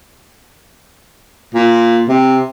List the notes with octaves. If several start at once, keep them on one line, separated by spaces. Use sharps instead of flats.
A#2
C3